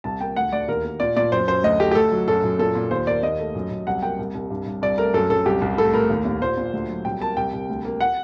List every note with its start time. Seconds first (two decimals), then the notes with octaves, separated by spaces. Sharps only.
0.04 C2 A5
0.20 A#3 G5
0.36 D2 F#5
0.52 D2 D5
0.68 D#2 A#4
0.84 A#3
1.00 A#2 D5
1.17 A#2 D5
1.32 F#2 C5
1.48 F#2 C5
1.64 D2 D#5
1.80 A3 G4
1.91 G4
1.95 D2 A4
2.12 F#3
2.28 F#2 A4
2.44 F#2
2.59 A#2 A4
2.75 A#2
2.91 D#2 C5
3.07 A#3 D5
3.23 D#2 D#5
3.39 A3
3.55 F#2
3.71 F#2
3.87 C2 F#5
4.02 A#3 G5
4.19 C2
4.35 C2
4.50 G2
4.66 G2
4.82 C2 D5
4.98 A3 A#4
5.14 F#2 A4
5.30 F#2 A4
5.46 C2 G4
5.62 C2
5.78 A2 A4
5.94 A2 A#4
6.10 D#2
6.25 D#2
6.42 A#2 C5
6.58 A#2
6.73 D2
6.89 F#3
7.05 C2 G5
7.21 A#3 A5
7.37 C2 G5
7.53 C2
7.69 D2
7.85 A#3
8.01 F#5